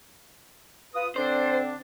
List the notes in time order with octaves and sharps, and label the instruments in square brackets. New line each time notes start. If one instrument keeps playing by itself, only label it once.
[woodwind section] F4 B4 D#6
[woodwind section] D3 C4 D4 [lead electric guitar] C5